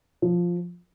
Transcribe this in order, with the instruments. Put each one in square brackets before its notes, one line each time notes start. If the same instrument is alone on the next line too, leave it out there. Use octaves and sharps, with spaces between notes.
[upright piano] F3